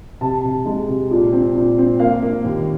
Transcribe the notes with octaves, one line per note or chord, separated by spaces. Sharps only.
C3 A5
C3
G#3
C3
A#2
C4
A#2
C4
A#3 F5
A#3
D#2